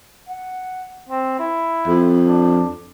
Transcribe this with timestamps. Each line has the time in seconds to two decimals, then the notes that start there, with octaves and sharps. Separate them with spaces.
0.29 F#5
1.09 C4
1.39 E4
1.87 F2
2.27 D4